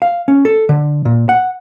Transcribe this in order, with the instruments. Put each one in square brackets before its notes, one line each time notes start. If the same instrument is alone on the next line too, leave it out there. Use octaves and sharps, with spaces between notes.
[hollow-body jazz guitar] F5
C#4
A4
D3
A#2
F#5